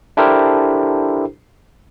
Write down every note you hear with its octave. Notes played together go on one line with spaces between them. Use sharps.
D4 E4 G4 A4 A#4 C5